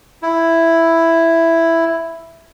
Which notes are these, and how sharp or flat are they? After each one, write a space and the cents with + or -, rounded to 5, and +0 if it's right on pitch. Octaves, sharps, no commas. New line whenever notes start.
E4 +5